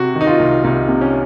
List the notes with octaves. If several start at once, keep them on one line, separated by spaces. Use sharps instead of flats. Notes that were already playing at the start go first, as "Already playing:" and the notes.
Already playing: C3 F#4
D#3
D#4
F4
C2
C2 D#4
C3
C#4